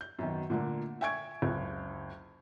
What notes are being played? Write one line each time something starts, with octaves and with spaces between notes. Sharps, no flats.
G6
F#2 B2 D#3
A#2 D3 A3 A#3
E5 G5 G#5 C#6 G#6 D7
F#1 C#2